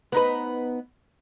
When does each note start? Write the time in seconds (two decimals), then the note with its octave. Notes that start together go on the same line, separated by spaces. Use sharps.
0.12 B3 D#4 B4